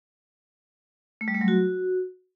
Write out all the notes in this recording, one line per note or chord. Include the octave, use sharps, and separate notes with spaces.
A3
G3
A3
F#3
F#4